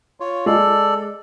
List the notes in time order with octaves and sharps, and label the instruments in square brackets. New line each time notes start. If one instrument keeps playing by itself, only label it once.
[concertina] F4 C#5
[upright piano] G#3 [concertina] A4 D5